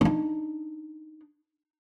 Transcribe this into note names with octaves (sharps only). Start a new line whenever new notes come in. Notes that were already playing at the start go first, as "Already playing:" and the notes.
D4 D#4